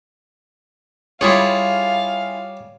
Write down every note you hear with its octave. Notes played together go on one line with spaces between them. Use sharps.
G3 E4 F4 G#4 C#5 F5